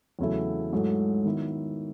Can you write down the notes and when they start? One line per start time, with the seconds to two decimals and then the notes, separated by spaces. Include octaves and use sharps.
0.19 E2 C#3 F#3 A3 E4
0.72 G#2 F#3 A3 E4
1.25 D#3 F#3 B3 E4